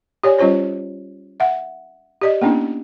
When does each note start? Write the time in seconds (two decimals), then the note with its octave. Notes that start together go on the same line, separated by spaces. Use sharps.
0.24 G4 C#5 D5 G#5
0.39 G3 C#4 F4 C5 C#5
1.40 E5 F#5
2.21 G4 D5 D#5
2.41 A#3 B3 C#4 D4 E4